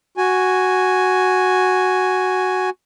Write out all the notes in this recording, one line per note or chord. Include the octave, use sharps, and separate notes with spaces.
F#4 G#5